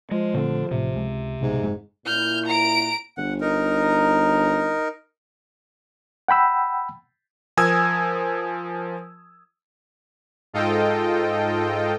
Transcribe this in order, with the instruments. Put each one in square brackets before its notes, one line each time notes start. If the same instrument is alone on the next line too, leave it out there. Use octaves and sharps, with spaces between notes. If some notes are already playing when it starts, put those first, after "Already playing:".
[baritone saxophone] F3 [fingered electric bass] G#3
[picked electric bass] A#2 A3 C4 [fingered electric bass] D3
[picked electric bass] A1 A2 [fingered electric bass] C3
[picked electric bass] C#2 G#3
[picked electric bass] C2 B2 [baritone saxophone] G#2
[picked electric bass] F#1 G#3
[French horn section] A#2 E4 [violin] F6 G6
[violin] A#5 D7
[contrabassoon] G1 [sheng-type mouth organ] F#5
[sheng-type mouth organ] D#4 A#4
[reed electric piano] F#5 G5 B5 E6
[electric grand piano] F3 A#4 G#5 D#6 E6 G#6
[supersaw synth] G#2 F4 A4 D#5 G5